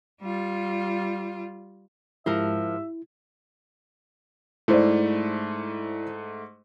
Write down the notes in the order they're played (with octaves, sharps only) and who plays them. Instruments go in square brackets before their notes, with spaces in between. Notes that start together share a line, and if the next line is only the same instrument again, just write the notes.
[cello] G3 F4
[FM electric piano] G#2 G#3 G4 [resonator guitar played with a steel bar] F3 A#4 A5 [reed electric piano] E4 [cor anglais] E5
[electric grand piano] G#2 A3 [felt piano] E4 C5 D5